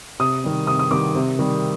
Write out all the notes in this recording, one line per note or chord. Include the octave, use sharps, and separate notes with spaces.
C3 D#6
D#3 G3
C3 D#6
D#6
D#3 G3 D6
C3
D#3 G3